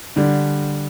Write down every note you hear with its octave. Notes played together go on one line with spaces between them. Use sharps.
D3 G3 D4